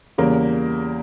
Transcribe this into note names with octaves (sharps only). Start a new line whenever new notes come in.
E2 C#3 G3 A#3 A#4